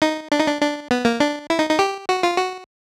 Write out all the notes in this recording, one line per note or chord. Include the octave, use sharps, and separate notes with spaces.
D#4
D4
D#4
D4
D4
B3
A#3
D4
E4
D#4
D#4
G4
F#4
F4
F#4